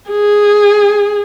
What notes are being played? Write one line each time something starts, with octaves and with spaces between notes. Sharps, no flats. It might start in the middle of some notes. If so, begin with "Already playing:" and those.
G#4